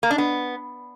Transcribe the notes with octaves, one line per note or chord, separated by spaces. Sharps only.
A#3
D4
B3